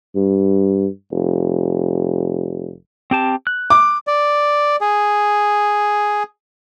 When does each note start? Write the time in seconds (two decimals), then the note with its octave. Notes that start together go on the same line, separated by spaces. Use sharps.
0.16 G2
1.12 F1
3.11 C4 G4 A5
3.47 F#6
3.70 D6
4.07 D5
4.81 G#4